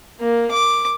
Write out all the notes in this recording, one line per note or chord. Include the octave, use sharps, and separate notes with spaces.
A#3
D6